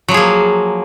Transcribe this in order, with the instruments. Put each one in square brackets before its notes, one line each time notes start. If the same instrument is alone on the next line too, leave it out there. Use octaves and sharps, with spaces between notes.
[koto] F#3
F3
G#4
A#3